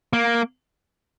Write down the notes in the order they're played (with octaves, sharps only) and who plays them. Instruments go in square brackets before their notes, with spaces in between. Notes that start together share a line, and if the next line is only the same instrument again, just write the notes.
[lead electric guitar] A#3